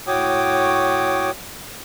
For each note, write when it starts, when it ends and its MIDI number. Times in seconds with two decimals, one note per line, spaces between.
0.07 1.31 45
0.07 1.31 66
0.07 1.31 73
0.07 1.31 79
0.07 1.31 86
0.07 1.31 87